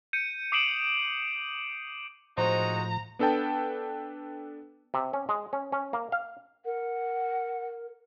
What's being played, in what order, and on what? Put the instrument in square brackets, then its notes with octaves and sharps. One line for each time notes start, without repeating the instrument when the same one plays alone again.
[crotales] G6 C#7 D#7
D6 D#6 C7 D7 E7 F#7
[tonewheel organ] A2 F3 [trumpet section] G#3 D#4 F#4 [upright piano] C5 [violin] A#5
[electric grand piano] B3 D4 A4 B4 G5 A5
[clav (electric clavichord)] C3
C#4
G#3
C#4
C#4
A#3
F5
[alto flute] A#4 [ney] F#5